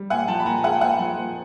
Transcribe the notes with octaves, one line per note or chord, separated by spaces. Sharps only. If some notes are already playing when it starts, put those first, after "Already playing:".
Already playing: G3
A#2 F#5 G#5
F3 G5 A5
B5
A#2 G#5 A#5
G#3 F#5 G#5
G5
A#2 F#5 G#5
F3
A#2